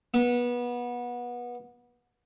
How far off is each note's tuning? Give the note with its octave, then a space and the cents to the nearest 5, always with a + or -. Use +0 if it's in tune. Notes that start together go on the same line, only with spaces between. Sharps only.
B3 -25